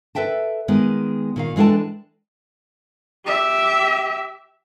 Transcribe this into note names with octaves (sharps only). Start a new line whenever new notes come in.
A4 B4 E5 G5 A5
D#3 G#3 B3
A#2 D#3 F5
E3 G#3 D4 A4 G5 A5
G4 E5